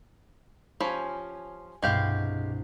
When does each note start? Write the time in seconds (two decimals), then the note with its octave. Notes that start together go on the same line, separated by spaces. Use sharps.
0.80 F3 C#4 G4 G#5 B5
1.82 C2 G2 B2 G#3 G4 F5